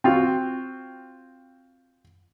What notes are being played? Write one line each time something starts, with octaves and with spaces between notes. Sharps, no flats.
C4 F4 F#4